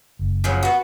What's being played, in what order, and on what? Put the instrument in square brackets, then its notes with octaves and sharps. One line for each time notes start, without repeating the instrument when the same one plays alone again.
[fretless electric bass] F#1
[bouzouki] C#3 F3 F#3
B3 F#4